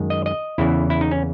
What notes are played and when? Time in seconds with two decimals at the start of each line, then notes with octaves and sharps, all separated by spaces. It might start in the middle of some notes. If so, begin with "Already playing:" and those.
Already playing: F#2 D#3 G#3
0.10 D#5
0.26 D#5
0.58 E2 C#3 E3 E4
0.90 E4
1.01 D#4
1.11 C#4